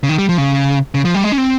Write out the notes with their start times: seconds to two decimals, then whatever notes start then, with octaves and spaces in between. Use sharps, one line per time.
0.03 C#3
0.09 D#3
0.18 G3
0.29 F3
0.38 C#3
0.94 C#3
1.05 F3
1.15 G3
1.24 G#3
1.32 C#4
1.38 C4